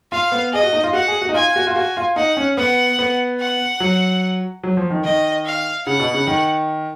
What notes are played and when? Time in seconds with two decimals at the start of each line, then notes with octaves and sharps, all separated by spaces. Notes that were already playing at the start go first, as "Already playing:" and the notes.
0.12 F4 F5
0.32 B3
0.53 G#4 D#5
0.63 F#4
0.73 D#4
0.84 F4
0.93 F#4 F#5
1.08 G#4
1.22 F#4
1.29 D#4
1.34 F4 G#5
1.56 F#4
1.67 F4
1.76 F#4 G#5
1.97 F4
2.16 D#4 F#5
2.37 C#4
2.57 B3 F#5
2.99 B3
3.40 F#5
3.80 F#3
4.63 F#3
4.77 F3
4.91 D#3
5.04 D#3 D#5
5.45 F5
5.86 C#3 F#5
6.00 B2
6.14 C#3
6.27 D#3